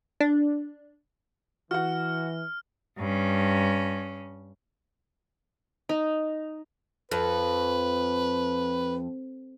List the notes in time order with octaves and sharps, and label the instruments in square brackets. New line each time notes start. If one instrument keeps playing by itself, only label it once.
[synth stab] D4
[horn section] E3 [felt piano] F#4 F#5 [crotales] F6
[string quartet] G2 C#4
[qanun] D#4
[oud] F2 [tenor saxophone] B4